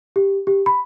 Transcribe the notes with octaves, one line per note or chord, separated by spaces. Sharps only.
G4
G4
B5